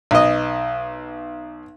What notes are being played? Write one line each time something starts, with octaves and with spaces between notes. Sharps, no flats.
B1 D#5